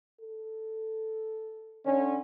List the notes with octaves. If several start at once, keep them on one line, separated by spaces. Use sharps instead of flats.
A4
D3 C#4